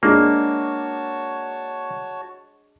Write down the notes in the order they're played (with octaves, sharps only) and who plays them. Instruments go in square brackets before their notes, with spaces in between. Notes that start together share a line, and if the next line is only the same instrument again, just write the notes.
[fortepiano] G#3 D4 [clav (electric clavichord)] A#3 [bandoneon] F#4 C#5 A5